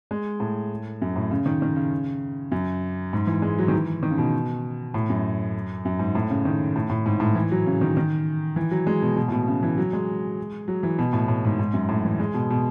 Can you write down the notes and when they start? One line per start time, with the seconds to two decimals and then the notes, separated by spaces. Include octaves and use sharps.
0.11 G#3
0.40 A2
1.02 F#2
1.16 A2
1.31 C#3
1.46 D#3
1.62 D#3
1.76 C#3
2.52 F#2
3.13 G#2
3.27 E3
3.42 G#3
3.58 F#3
3.68 D#3
3.73 E3
4.03 D#3
4.11 C#3
4.18 B2
4.94 A2
5.09 F#2
5.85 F#2
5.99 G#2
6.15 A2
6.30 C#3
6.45 D#3
6.76 A2
6.90 A2
7.06 G#2
7.20 A2
7.35 E3
7.51 F#3
7.66 C#3
7.81 D#3
7.97 D#3
8.56 E3
8.71 F#3
8.87 G#3
9.02 B2
9.17 B2
9.28 A2
9.32 B2
9.47 C#3
9.63 E3
9.78 F#3
9.93 G#3
10.68 F#3
10.83 E3
10.98 B2
11.13 A2
11.28 A2
11.44 G#2
11.59 G#2
11.74 F#2
11.89 A2
12.05 E3
12.20 G#3
12.34 B2
12.50 B2